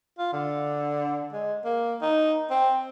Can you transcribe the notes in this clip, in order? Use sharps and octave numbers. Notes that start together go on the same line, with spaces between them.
F4
D3
G#3
A#3
D#4
C4